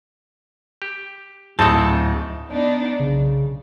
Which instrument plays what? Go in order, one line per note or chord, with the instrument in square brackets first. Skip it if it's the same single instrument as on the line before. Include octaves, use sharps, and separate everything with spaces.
[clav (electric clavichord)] G4
[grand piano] D1 [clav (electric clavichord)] C4 D#4 A4 [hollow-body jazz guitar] D#5 A5
[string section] B3 D4 D#4
[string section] B1 [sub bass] C#3